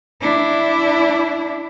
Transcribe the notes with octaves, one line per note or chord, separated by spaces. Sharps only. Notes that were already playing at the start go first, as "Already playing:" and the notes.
D4 E4